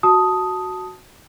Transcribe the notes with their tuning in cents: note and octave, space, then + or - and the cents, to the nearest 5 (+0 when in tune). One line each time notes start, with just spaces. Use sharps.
F#4 +0 A5 +0 D#6 +5